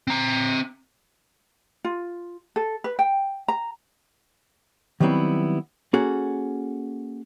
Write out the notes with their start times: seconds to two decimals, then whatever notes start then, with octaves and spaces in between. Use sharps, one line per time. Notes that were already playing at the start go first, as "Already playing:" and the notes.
0.07 C4 A#5
1.85 F4
2.56 A4
2.84 B4
2.99 G5
3.48 A#5
5.00 D#3 F#3 G3 B3 C4 E4
5.94 A#3 C#4 F#4 G#4 A4